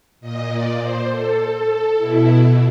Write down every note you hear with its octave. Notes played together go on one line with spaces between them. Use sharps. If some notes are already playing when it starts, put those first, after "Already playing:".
A#2 D#5
D5
C5
A4
A4
B2 E4